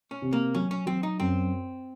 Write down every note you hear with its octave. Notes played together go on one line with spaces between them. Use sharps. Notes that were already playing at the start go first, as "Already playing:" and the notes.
C#4
C3
A#3
F#3 C#4
C#4
F#3 C4
D#4
F#2 C4